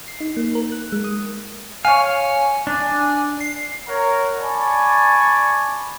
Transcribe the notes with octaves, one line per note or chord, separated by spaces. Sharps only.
C7
D#4
A#3
A#4
F#6
G#3
D#6
C#5 F5 G#5
D4
C7
A#4 C#5 F#5 A#5
D5 G#5 A5 B5 C#6